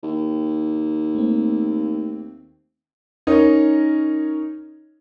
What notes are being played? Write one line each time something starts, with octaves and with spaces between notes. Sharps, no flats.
D#2
A3 A#3 C4
C#4 D#4 A#4 C#5 D#5